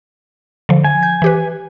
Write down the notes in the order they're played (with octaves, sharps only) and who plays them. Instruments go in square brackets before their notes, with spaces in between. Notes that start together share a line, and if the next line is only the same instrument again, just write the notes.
[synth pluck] D3 F3
[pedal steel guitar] G#5
[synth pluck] G6
E3 G4 B4